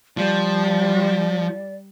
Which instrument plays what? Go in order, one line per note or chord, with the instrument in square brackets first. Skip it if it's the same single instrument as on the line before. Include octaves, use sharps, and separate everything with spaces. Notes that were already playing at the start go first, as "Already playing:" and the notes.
[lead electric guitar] F3 [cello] G3 [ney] D5